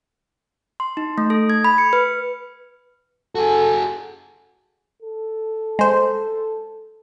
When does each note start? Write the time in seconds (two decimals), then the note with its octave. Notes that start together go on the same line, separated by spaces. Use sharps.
0.80 C6
0.97 D#4
1.18 A3
1.30 A4
1.50 G#6
1.64 B5
1.78 C#7
1.93 B4
3.35 F#4 G#4 A4
5.02 A4
5.79 G#3 C5